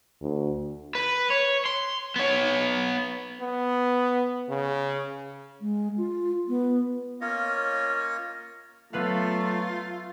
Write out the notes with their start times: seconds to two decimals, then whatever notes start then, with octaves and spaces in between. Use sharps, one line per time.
0.21 D2
0.95 B4
1.30 C#5
1.66 C6
2.16 B3 C#5
3.41 B3
4.49 C#3
5.61 G#3
5.97 F4
6.48 B3
7.21 A#3 C#4 F4 C#5 D#5
8.93 F#3 A3 B3 F4 B4 F5